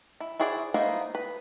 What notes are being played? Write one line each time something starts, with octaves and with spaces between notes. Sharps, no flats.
E4
E4 F#4 G#4 C5 D5
A#3 B3 D#4 E4 C5
B4